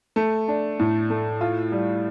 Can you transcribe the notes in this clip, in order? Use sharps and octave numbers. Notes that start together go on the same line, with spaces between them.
A3
D4
A2
A3
F4
G3